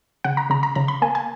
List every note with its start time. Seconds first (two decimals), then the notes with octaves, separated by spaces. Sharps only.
0.24 C#3 F#5
0.37 A#5
0.50 C#3 A#5
0.63 A#5
0.75 C#3 A#5
0.88 B5
1.02 A#3 G#5
1.15 G#5